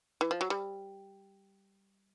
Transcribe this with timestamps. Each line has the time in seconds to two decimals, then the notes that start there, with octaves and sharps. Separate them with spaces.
0.21 E3
0.31 F3
0.41 F#3
0.50 G3